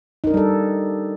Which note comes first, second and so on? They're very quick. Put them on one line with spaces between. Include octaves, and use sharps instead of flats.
D#4 A#4 D4 G3 A4